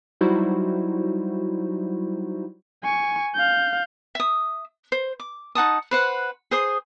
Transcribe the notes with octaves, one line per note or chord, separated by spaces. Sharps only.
F#3 G3 D#4 E4 F#4 C5
G#5 C#6
F5 G6
E5 D#6
C5
D6
D#4 F#5 A5 D#6
B4 C5 F#5
G#4 C5 D#6